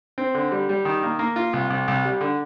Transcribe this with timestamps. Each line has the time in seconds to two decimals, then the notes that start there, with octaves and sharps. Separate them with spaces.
0.18 C4
0.34 D3
0.51 G3
0.69 G3
0.85 D#3
1.03 A#3
1.19 A#3
1.36 F4
1.53 C2
1.70 C2
1.88 C2
2.05 G3
2.21 D3